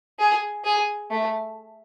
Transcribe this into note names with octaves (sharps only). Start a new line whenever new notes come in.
G#4
G#4
A3